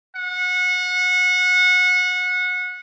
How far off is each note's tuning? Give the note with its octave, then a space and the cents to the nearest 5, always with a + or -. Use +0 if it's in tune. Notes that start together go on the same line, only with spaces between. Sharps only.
F#5 -25